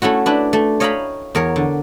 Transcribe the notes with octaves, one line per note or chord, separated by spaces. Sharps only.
A3 C#4 E4 F#4
D4 E4 B4
A3
C#5 D#5 F5 G5 A#5 B5
E2 A#4 C#5
D3